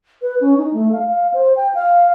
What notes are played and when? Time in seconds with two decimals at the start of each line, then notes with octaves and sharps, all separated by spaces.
0.22 B4
0.41 C#4
0.57 D#4
0.73 A3
0.92 F5
1.08 F5
1.34 C5
1.56 G5
1.74 F5